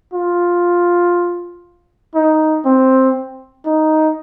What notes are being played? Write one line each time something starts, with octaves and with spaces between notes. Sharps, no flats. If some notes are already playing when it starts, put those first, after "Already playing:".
F4
D#4
C4
D#4